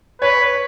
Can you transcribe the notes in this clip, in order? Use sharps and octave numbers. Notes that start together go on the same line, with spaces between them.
B4 C#5